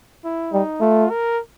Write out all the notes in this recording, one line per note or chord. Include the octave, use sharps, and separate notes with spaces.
E4
G3 D#4
A3 F4
A#4